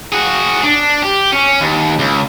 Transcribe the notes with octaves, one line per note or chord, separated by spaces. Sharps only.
F#4 G#4
D4
G4
C#4
D#2
C#2